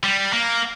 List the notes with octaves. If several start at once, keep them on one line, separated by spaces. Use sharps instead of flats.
G3
A#3